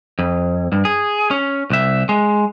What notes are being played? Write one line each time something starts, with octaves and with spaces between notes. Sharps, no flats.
F2
G2
G#4
C#4
C2 E5
G#3